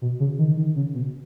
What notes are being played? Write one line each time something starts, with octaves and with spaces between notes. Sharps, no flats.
B2
C#3
D#3
D#3
C#3
B2